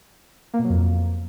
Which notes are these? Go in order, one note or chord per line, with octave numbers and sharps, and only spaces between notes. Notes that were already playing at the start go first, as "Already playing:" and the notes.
A#3
B2
F#3
F2